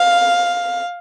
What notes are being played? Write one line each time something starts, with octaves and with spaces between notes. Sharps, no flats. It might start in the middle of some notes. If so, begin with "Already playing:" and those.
Already playing: F5